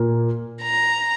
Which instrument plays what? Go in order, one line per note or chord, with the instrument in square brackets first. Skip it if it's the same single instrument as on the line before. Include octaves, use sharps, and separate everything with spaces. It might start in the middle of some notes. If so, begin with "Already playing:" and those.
Already playing: [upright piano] A#2 A#3
[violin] A#5